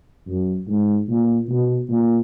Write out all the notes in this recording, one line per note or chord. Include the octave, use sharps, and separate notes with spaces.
F#2
G#2
A#2
B2
A#2